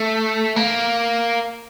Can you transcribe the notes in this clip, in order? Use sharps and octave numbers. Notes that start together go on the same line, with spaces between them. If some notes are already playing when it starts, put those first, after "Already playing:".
Already playing: A3
A#3